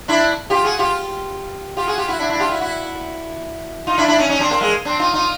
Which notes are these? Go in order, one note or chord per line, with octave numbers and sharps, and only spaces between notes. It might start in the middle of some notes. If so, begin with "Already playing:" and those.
D4 E4
F4 G4
F#4 G#4
F4 G4
F4 G4
F#4 G#4
F4 G4
E4 F#4
D4 E4
D4 E4
F4 G4
E4 F#4
E4 F#4
D#4 F4
D4 E4
D4 E4
C#4 D#4
C#4 D#4
C4 D4
A#3 C4
G#3 A#3
C4 D4
D#4 F4
D#4 F4